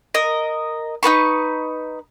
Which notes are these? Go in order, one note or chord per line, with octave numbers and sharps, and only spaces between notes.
A#4 D#5
D#4 F4 B4 C#6